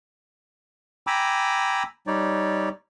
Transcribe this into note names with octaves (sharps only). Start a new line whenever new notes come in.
G5 G#5 A#5 B5 D6 E6
G3 D#4 C#5 D5